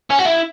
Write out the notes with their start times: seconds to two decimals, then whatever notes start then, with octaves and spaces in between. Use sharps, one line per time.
0.10 C#4
0.19 F#4
0.25 E4